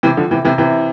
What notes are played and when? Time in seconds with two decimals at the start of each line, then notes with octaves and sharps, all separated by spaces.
0.03 C3 E3
0.17 D3 F3
0.31 C3 E3
0.45 C3 E3
0.58 C3 E3